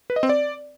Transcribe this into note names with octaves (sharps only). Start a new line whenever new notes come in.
B4
D#5
C4
D5